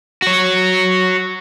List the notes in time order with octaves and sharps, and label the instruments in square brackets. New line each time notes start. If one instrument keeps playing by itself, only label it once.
[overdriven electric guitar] F#4 C#5